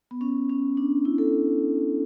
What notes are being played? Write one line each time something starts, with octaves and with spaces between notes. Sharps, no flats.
B3
C#4
C#4
D4
E4
A4